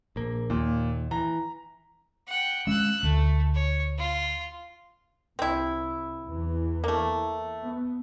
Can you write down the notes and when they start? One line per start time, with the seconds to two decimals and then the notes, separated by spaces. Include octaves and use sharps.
0.16 A#1 A#3
0.50 D#2 A#2
1.11 E3 A#5
2.27 F#5 G5
2.67 G#3 C#4 E6 F#6
3.03 D2 A3
3.55 C#5
3.98 F4
5.39 C2 C4 E4
6.25 E2 E3
6.84 A3 A#3
7.62 B3